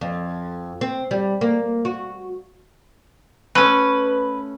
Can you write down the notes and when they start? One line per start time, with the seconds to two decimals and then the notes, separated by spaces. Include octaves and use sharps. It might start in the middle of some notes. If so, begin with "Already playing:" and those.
0.01 F2
0.81 C4
1.11 G3
1.41 A#3
1.85 F#4
3.55 A3 C#4 B4